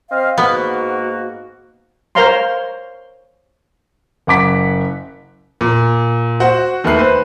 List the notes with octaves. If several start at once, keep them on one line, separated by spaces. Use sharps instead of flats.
C4 D#5 F5
G#2 A#3 B3 F#4
A#4 C5 C#5 F5 A#5 C6
F#1 F#5 D6 B6
A#2
F#4 C5 F#5
D#2 A3 B4 F#6 C7
B4 C5